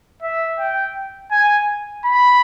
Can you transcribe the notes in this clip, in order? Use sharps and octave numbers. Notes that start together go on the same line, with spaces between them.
E5
G5
G#5
B5